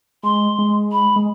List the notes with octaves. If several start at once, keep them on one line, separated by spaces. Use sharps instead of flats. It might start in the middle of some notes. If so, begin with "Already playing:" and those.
G#3 C6
G#3
B5
G#3